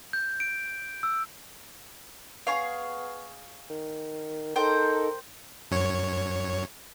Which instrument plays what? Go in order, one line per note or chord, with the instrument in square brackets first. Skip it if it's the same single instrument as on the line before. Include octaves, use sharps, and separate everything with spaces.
[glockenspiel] G6
D7
E6
[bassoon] B3 [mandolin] G#4 C#5 F5
[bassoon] D#3
[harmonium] D#4 A4 [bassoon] A#4 [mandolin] C5 G5
[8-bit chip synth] F#2 C#5